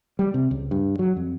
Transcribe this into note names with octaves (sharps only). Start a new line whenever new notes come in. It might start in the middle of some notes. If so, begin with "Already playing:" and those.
G3
C3
C#2
G2
F#3
F2